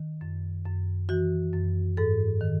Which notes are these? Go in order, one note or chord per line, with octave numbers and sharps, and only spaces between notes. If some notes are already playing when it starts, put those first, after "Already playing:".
Already playing: D#3
F#2
F#2
E3 F#4
F#2
G#2 A4
D#3